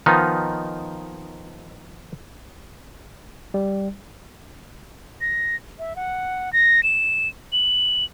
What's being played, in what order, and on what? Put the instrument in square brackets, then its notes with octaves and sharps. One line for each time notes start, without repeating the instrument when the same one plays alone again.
[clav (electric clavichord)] D#3 F3 B3 D#4
[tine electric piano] G3
[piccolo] A#6
E5
F#5
A#6
E7
F#7